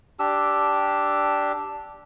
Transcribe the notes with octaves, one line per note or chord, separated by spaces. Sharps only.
D4 G4 E6